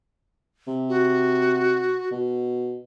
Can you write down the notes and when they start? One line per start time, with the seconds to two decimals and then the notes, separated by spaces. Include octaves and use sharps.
0.68 C3
0.89 F#4
2.12 B2